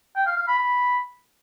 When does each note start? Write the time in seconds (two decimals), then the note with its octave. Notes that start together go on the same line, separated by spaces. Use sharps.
0.16 G5
0.26 F5
0.37 F5
0.48 B5
0.58 B5